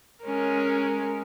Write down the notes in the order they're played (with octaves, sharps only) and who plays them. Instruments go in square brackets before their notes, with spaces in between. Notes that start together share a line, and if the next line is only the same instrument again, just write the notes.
[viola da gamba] G#3 C#4 A#4